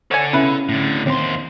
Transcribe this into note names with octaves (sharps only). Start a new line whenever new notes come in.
A4 C#5 D5 F#5 G#5
C#3 E4 B4
A2 D3
D#2 C4 C6